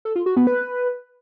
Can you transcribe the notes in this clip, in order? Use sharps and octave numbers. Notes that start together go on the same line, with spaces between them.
A4
F4
F#4
B3
B4